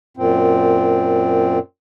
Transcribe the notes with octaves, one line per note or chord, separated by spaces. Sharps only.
F#2 A#2 C4